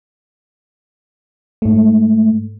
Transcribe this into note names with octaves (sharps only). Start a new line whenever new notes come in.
G#2 A3